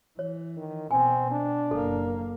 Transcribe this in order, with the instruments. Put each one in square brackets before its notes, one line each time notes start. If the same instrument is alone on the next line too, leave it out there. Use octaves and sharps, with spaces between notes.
[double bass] E3 [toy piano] C#5
[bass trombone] D#3
[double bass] B2 [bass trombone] C4 [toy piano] G#5
[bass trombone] D4
[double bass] F#1 A#3 [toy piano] A4